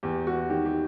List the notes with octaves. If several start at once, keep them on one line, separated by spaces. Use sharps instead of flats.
E2 G4
E2 F#4
D#3 G4
G4